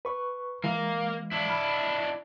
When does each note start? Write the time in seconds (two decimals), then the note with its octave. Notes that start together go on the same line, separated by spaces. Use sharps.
0.05 B4 C#6
0.64 E3 G#3 A#3
1.32 D4 E4
1.49 B5 F6